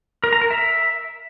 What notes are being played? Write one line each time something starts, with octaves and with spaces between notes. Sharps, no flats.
A#4
A#5
A#4
E5